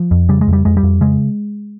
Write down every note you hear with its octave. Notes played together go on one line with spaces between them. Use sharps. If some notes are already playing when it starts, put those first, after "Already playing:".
Already playing: F3
F2
C#3 G3
G#3
F2
G3
F2 G#3
G3
F2
C#3 G#3